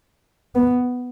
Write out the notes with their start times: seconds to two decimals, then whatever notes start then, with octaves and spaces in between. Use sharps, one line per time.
0.55 B3